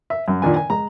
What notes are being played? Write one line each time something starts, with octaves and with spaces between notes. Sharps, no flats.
E5
F#2
A#2 D#3 D4 G#5
G#5
G#3 A#5